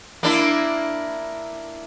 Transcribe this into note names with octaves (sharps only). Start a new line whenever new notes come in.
A#3 D4 E4